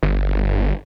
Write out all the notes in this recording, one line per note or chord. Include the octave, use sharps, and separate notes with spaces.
G1